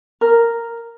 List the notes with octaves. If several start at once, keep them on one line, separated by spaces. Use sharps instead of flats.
A#4